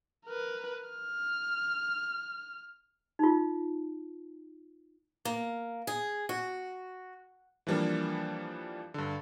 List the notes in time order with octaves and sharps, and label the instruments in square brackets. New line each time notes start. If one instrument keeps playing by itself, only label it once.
[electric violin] A#4 B4
F6
[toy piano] D#4 F4
[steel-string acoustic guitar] A#3
G#4
F#4
[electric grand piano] E3 F3 G3 A#3 D4
G2 D3